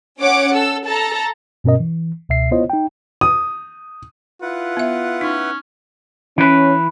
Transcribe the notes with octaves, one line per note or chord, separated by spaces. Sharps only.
C#4 C#5 F#5 D6
A4 E6
A4 A5 A#5
G2 B2 C#4 A#4 D#5
E3
C#2 B2 E5 C7
B3 E4 F4 C5 C#5 D#5
D#4 G5
D#6
E4 F4 B4 F#5
B3 E5
C#4 D#4
E3 C#4 B4